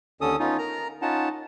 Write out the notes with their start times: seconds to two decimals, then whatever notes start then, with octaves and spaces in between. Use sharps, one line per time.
0.21 D#2 D3 C#4 A4 D#6
0.39 B3 C#4 D#4 F4
0.58 A#4 A#5
1.02 C#4 D#4 F4 F#5 A5